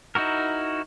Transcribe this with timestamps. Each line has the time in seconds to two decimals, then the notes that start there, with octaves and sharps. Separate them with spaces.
0.15 D#4 E4 F#4 A#4